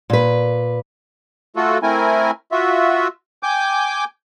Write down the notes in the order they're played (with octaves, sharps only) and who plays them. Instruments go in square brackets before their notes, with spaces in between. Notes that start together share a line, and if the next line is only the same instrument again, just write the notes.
[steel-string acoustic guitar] A#2 B4
[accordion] A3 F4 F#4 A4
A3 C4 E4 A#4 G#5
F4 F#4 E5
G5 G#5 D6 G6